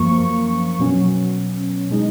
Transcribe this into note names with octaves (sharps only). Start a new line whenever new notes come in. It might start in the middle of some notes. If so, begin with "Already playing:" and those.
Already playing: F#2 F3 A#3 C#6
B2 F#3 C#4
B2 G#3 D#4